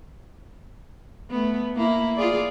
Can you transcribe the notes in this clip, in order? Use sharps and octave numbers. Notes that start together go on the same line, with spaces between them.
A3 B3
A#3 E4
F4 G#4 D5